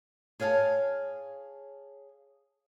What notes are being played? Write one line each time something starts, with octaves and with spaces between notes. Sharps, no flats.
G#4 C#5 F5 F#5 A5